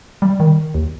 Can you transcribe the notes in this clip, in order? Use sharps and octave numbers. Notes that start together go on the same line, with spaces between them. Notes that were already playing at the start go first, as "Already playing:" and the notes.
G3
D#3
D#2